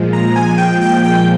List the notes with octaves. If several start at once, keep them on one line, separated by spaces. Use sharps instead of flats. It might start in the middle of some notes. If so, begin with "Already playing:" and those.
Already playing: A#2 F3 G#3
A#5
G#5
G5
G5
G5